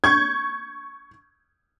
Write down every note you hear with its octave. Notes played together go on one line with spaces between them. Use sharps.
C#6 G6 G#6